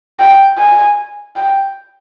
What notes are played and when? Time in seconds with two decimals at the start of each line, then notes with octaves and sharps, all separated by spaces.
0.20 G5
0.58 G#5
1.36 G5